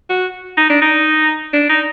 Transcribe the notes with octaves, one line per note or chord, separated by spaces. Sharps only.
F#4
D#4
D4
D#4
D4
D#4